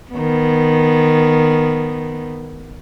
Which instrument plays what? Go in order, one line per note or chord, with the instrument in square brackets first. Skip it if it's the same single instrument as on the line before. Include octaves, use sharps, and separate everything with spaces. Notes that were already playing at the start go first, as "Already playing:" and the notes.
[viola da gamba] D#3 B3